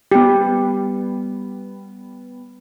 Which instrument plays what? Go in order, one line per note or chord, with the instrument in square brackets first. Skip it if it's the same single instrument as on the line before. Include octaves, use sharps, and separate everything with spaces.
[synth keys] G3 B3 [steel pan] G4